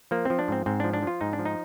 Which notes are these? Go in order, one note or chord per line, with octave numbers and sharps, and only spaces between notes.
F3 A#3
F3 C4
D4
G#2 C4
G#2 C4
F3 D4
D4
F3 F4
G#2 D#4
D4
F3
D#4